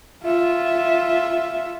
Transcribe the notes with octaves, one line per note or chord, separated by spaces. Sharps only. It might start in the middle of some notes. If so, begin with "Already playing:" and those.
F4 E5